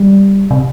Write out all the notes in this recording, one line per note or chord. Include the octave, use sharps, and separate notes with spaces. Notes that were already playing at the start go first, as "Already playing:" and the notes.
Already playing: G3
C3